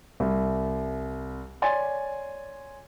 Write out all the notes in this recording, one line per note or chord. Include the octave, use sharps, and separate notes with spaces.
C2
C#5 D5 G#5 C6 A6